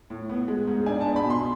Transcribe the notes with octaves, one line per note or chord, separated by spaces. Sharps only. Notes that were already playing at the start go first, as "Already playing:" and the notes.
A2
B3
G#3
G#2
D4 G#5
A5
B3
B5
B2
C6